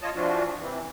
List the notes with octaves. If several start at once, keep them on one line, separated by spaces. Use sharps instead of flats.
F4 C#5 D#5 A5
E3 F3 D4 F4 F#4
C3 E3